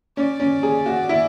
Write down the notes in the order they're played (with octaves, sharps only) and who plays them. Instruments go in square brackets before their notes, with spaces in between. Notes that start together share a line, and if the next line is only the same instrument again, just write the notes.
[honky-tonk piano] C#4 [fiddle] D5
[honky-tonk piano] C#4
G#4
F#4
E4